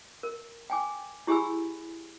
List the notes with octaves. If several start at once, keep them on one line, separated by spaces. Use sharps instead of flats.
A#4
G5 G#5 D6
E4 G4 G#4 G#5 B5 E6